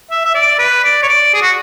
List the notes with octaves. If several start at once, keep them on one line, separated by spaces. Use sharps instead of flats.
E5
E5
D5
B4
D5
C#5
D5
G#4
F#4